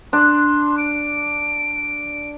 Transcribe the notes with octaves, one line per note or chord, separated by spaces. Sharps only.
D4 C6
D7